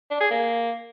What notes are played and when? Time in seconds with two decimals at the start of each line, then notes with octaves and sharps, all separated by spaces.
0.11 D4
0.21 G#4
0.31 A#3